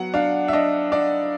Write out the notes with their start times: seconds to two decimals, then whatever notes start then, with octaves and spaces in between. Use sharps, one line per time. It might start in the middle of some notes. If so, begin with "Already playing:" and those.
Already playing: F#3 B3 F#5
0.14 D4 F5
0.48 E5
0.53 D4 D#5
0.92 D4 D5